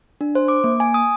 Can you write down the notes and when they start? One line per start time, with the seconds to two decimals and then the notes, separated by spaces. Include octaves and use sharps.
0.21 D4
0.35 C5
0.48 D6
0.64 A#3
0.80 G#5
0.94 D#6